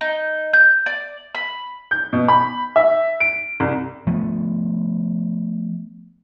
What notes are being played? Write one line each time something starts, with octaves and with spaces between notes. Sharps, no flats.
D#4
G6
D5
B5
G6
B2
B5
E5
D7
C2
F3 A3 B3